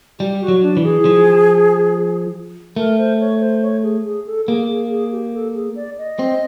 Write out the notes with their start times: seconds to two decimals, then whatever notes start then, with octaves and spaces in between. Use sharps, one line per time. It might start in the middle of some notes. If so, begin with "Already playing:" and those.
0.20 G3 G4
0.41 F#4
0.48 F#3
0.62 D4
0.77 E3
0.83 G#4
1.05 F3
2.76 A3 A#4
2.98 C5
3.20 C#5
3.40 C5
3.62 C#5
3.83 G#4
4.05 G#4
4.26 A4
4.48 A#3 G#4
4.68 G#4
4.90 G#4
5.12 G4
5.33 A4
5.54 G#4
5.75 D5
5.98 D#5
6.19 C4